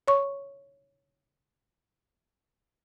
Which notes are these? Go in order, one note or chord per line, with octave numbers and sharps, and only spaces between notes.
C#5 C#6